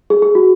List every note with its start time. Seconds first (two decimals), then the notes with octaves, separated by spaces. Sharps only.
0.10 G#4
0.22 G#4
0.35 F#4